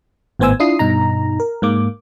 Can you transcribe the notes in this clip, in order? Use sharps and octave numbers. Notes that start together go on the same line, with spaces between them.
G#1 A2 B3 C5 G#5 E6
D4 E4 F4 D#6 C7
G2 B2 D#4 A#5
A#4
G#2 A#3 D6